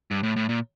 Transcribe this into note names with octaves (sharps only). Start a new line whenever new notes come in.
G2
A2
A2
A#2